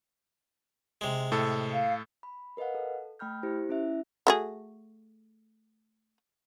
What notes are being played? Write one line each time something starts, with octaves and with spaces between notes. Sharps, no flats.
C3 G#3
A2 A4
F5
B5
A#4 B4 D#5 F5 F#5
A4
A3 G5 B5 F6 G6
E4 G4 C5
C#4 E4 E5
A3 F#4 G#4